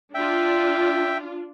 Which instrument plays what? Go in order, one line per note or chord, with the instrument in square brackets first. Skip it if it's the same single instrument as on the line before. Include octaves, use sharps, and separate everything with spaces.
[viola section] D4 F4 [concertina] E5 G5